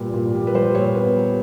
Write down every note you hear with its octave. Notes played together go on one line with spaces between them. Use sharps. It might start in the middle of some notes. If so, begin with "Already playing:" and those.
Already playing: A#2 G3 B4
A#2
G3
B4
G3 C5
A#2 C#5
B3 B4
G3 A#4